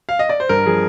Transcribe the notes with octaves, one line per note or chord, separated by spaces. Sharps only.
F5
D#5
D5
C5
G2 A#4
F3 G#4